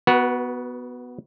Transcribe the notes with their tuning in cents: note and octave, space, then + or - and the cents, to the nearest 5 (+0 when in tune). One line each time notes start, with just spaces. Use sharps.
B3 +0 F#4 +0 B4 -40